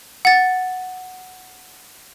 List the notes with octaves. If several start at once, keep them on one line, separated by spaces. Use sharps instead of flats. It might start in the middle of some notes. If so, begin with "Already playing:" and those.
F#5 A6